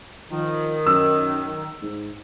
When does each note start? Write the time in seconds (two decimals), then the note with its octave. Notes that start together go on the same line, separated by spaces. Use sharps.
0.31 D#3 F3
0.87 F#2 E6
1.82 G#2